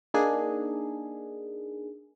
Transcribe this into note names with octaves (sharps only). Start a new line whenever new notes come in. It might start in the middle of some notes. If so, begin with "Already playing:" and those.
A#3 D4 D#4 G#4